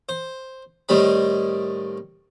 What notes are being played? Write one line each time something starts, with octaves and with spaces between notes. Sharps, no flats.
C5
A2 D#3 G3 C4 B5